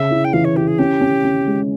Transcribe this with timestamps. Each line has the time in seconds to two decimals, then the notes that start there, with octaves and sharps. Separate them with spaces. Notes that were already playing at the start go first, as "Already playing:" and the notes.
Already playing: C#3 E5
0.11 E4
0.24 G5
0.33 E3 F5
0.45 C#5
0.56 E4 G4
0.67 G#4
0.78 C#4 G4
1.01 C#4
1.24 C#4
1.47 G#3